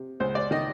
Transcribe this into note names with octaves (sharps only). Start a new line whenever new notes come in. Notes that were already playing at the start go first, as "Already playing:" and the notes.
Already playing: C3
C#2 C5
D5
D#3 D#5